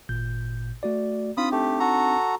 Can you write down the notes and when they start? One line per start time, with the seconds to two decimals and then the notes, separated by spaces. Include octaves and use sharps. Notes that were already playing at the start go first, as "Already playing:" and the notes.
0.09 G#1 A#2 G6
0.83 A3 F#4 D5
1.37 C4 D4 D#4 F4 B5 D#6
1.52 A3 G4
1.80 F#4 A4 A#5